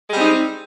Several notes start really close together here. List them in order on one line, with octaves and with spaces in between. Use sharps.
G#3 G3 C4 D#4